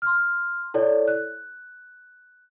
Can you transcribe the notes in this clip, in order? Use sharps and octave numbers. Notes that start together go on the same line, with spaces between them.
C6 F6
E4 A4 C#5 D5
F#6